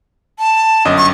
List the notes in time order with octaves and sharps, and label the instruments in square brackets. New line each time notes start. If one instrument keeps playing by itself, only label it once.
[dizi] A5
[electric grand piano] G1 F#2 D#5
[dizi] C#6